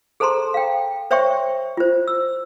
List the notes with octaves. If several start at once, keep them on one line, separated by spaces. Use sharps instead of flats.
G#4 A4 C5 A5 A#5 C6
F5 G5
C5 C#5 E5 G5 C6 C#6
F4 C5
E6